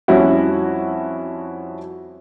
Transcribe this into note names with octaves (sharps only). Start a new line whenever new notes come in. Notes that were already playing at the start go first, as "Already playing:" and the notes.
F2 G3 C#4 E4 F#4